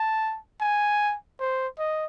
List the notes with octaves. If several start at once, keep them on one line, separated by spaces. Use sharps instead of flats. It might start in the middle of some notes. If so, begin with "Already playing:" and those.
Already playing: A5
G#5
C5
D#5